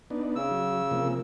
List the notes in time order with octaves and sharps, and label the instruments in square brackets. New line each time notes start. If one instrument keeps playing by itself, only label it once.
[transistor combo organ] B3 D4 D#4
[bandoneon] C#3 E6
[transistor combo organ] F#3
C3 F3 A#3